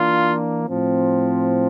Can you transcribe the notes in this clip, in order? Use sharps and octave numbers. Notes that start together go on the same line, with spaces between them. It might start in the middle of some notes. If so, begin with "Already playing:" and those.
Already playing: E3 A#3 D4 F4
A2 F3 C4